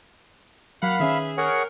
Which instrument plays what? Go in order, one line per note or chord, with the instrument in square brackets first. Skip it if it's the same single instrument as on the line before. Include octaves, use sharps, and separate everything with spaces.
[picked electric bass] F#3 [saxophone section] A#3 F#5 [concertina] F5 B5
[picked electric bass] D#3 C#4 [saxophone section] G#4 B4 E5
[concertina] G#4 C#5 F#5 [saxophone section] A#4